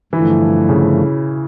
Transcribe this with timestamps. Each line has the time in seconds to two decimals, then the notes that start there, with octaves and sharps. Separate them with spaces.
0.13 G2 D3 E3 F3 A3
0.69 C#3